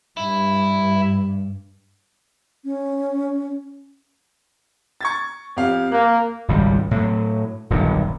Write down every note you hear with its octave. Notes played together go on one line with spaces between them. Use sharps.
G2 E4
C#4
C#6 G#6 A6
F2 G4 F5
A#3 F#6
G#1 C#2 C#3 G3
A2 F#3
D#1 B1 G2 D3